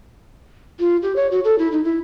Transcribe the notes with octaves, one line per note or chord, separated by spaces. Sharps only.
F4
G4
C#5
F#4
A4
E4
D#4
E4